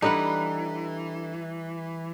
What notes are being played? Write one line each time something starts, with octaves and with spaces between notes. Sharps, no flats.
E3 G3 D4 D#4 A4 B4 F#5